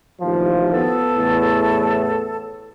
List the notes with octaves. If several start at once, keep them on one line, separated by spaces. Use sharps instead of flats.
A1 D#2 F3
B3 A4
E2 A2